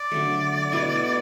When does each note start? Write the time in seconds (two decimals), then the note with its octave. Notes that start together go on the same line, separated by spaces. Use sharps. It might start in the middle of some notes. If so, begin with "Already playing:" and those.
Already playing: D5
0.11 D3 F#3 A3
0.72 B2 A3 E4